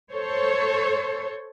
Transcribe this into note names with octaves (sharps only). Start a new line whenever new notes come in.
A4 C5 C#5